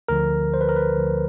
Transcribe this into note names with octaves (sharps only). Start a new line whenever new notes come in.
D2 D3 F3 A#4
C5
B4
A#4
B4
D2 D3 F3